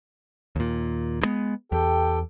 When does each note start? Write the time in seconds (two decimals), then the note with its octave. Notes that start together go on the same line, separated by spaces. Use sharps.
0.56 D#2 A#2
1.22 G2 G#3 B3
1.72 E2 G4 A4 G5